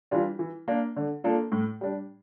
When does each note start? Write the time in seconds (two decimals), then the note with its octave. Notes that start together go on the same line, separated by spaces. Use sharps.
0.11 E3 G3 D4 F4
0.39 E3
0.68 A#3 D4
0.96 D3
1.24 F3 A#3 D4 A4
1.52 A2
1.81 G3 D4